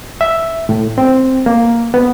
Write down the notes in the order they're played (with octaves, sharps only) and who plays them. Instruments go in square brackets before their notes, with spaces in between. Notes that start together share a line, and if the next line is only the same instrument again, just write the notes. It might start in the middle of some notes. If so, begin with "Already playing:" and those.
[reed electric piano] E5
A2
C4
A#3
B3